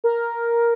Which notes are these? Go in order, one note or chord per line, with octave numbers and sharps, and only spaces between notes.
A#4